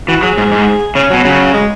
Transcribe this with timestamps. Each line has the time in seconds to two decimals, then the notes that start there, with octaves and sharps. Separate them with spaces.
0.08 E3 F#4
0.23 F#3 G#4
0.38 G#2
0.52 G#2
0.95 C#3 C#4
1.10 B2 F#3
1.24 C#3 F#3
1.53 G#3